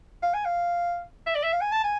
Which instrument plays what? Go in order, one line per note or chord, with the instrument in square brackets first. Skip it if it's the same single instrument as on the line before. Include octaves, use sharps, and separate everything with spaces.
[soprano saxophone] F5
G#5
F5
E5
D5
E5
F5
G#5
A5
G#5